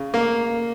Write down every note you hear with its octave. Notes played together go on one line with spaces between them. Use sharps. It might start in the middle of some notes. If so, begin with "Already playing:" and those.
Already playing: C#3
A#3